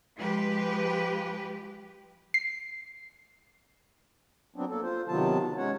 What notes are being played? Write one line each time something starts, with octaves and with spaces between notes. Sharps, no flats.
F3 G#3 G4 B4
C7
F#3 B3 C4 D4
A#3 A4
F4 C5
C3 D#3 F#3 B3 F4 A5
G#3 C#4 C#5 F#5